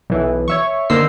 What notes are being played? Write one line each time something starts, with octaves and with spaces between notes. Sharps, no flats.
B1 E3
C#5 E5 C#6
D3 D#3 A#3 C5 E6 C7